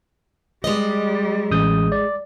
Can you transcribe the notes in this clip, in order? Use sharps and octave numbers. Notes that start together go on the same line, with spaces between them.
G3 G#3 D#5
A1 D#6 G6
D5